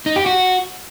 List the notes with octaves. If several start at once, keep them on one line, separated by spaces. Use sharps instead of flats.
D#4
G4
F#4